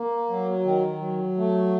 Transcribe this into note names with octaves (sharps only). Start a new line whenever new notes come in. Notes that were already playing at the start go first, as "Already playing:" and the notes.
Already playing: A#3
F#3
D#3
F#3
A3